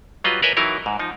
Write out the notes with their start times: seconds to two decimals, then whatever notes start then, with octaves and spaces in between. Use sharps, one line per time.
0.24 F#3 G3 F4 B4 D#5
0.42 A#4 B4 C#5 D#5 E5 G#5
0.57 E3 F#3 D#4 E4 A#4
0.86 G#2
0.99 F3 D#4